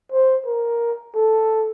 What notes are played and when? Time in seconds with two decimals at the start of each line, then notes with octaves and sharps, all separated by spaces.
0.12 C5
0.46 A#4
1.15 A4